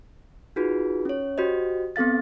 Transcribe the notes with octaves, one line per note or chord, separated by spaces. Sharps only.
D#4 F4 F#4 G#4 B4
C#4 C#5
F#4 G4 C5 D#5
B3 C4 A4 F5 A6